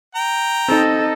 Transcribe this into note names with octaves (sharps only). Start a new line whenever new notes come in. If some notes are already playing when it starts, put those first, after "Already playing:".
G5 A#5
C4 D#4 A4 D#5